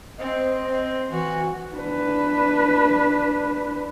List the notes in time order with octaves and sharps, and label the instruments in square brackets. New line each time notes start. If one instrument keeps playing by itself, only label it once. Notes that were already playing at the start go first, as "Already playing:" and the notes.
[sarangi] C4 [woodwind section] C5 D#5
[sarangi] C4
[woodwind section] E3 [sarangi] F#4
[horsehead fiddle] D4 B4